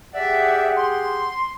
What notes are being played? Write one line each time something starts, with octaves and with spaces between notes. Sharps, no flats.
G4 G#4 D5 E5 F#5
C6